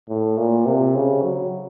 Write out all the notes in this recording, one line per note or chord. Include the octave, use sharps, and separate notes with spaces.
A2
A#2
C3
C#3
F#3